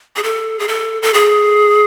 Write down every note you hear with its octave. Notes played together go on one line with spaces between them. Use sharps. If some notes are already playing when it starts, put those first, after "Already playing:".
G#4
A4
G#4
A4
A4
G#4